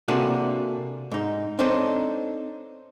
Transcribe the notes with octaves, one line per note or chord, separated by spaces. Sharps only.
C3 A#3 D4 F#4 G#4 A4
G#2 D#4
C4 D4 D#4 A4 C5 C#5